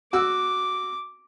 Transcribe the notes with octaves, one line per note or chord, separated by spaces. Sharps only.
F#4 D6 E6